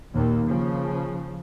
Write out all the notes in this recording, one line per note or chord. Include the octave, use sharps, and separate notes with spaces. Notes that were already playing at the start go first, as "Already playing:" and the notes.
D#2 A#2
C#3 F3